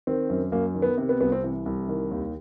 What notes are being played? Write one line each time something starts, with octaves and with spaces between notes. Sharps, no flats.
D#3 C4
F#2
F#2 A#3
D#3
B3
C3
B3
C2 B3
C4
E3
C2
D#3
D#2